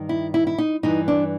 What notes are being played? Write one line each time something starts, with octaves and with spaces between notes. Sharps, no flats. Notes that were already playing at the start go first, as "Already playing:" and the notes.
Already playing: G2 D#3
E4
E4
E4
D#4
G2 E3 D#4
D4